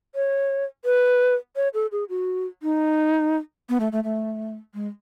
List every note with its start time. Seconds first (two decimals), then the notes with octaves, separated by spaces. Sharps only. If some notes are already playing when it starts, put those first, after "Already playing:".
0.15 C#5
0.85 B4
1.56 C#5
1.74 A4
1.92 G#4
2.09 F#4
2.63 D#4
3.69 B3
3.80 A3
3.92 A3
4.04 A3
4.74 G#3